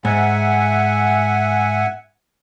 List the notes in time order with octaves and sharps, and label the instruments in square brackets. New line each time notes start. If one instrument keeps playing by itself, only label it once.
[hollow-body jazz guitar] G#2 [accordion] E5 F#5 G#5